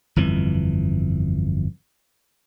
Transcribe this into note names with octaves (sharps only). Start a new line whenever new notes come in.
G1 F2 E3